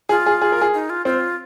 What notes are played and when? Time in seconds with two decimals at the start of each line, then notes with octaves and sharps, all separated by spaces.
0.09 F4 G#4
0.26 G#4
0.42 G#4
0.52 A#4
0.62 G#4
0.74 D#4
0.90 F4
1.05 C4 F4